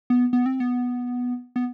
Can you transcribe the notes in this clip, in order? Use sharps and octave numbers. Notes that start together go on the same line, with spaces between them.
B3
B3
C4
B3
B3